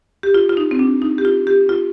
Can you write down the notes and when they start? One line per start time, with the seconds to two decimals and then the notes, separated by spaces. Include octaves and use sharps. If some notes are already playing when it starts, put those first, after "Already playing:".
0.23 G4
0.34 F4
0.49 F4
0.57 D#4
0.71 C4
0.79 D4
1.02 D#4
1.18 G4
1.25 F4
1.47 G4
1.69 F4